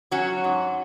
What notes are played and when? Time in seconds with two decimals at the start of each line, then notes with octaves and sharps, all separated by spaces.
0.11 F#3 C#4 F#4
0.44 G#2